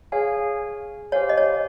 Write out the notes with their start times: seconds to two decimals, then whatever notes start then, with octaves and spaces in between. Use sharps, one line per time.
0.12 G#4 C#5 F5 G#5
1.12 G4 C5 C#5 F5 G#5
1.30 D#5
1.38 C#5